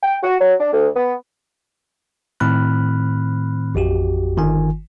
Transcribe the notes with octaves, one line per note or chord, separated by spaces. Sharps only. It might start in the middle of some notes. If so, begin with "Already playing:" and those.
G5
F#4
F#3
D4
D2
B3
A2 D#3 C4 B5 F6 F#6
A1 F2 F#4 G4
G1 D#3 G#5